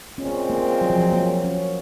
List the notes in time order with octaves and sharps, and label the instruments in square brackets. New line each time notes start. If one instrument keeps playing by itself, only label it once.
[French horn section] A#2 G#3 C4 [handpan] C#4
[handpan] A#3
F#3
F3
F#3
A#3
C#4